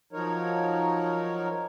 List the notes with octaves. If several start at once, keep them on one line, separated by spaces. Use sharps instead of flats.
F3 F#3 D#4 A#4 C#5